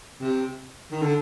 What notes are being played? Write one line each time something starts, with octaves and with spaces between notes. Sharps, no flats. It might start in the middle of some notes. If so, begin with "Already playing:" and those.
C3
D#3
D3